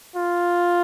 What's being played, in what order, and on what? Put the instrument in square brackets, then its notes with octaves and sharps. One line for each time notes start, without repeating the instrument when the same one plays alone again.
[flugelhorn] F4